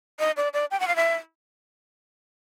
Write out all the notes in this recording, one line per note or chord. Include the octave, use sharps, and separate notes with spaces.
D#5
D5
D5
G5
F#5
F5
E5